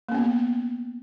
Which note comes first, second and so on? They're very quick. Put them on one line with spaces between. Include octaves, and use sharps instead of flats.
A#3 C#4 B3